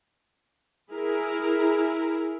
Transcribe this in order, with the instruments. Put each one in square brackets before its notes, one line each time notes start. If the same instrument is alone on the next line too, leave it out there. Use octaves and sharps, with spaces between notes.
[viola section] E4 G#4 A#4